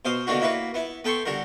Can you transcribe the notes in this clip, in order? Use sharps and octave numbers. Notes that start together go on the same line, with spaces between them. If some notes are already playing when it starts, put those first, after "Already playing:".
B2 C5 F5 D#6
B2 D3 D#3 A#3 D4 F#4
A#3 E4 F#4 B4
B3 E4
B3 A4 G5 C6 C#6
D3 G3 F#4 A#4